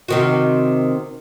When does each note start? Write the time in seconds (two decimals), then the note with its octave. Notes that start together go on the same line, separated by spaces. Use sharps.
0.08 C3 D#3 F#4